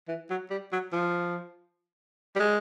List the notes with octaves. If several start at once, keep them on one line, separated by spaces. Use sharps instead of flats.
E3
F#3
G3
F#3
F3
G3
G#3